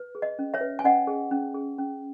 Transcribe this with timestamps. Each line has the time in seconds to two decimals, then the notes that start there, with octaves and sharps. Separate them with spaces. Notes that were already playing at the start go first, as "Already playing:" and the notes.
Already playing: B4
0.15 G#4
0.22 D#5
0.39 C#4
0.54 C#5 E5
0.61 B4
0.79 G#5
0.84 C#4 D#5 F#5
1.07 G#4
1.31 C#4
1.54 G#4
1.78 C#4